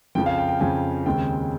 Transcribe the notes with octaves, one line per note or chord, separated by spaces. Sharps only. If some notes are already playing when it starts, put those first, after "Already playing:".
F2 C#3 F3 G5
F5
G5
G5
F2 C#3 F3 G#5
D#2 C#3 G#3 C4 G5